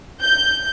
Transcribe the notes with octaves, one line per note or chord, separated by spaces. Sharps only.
G6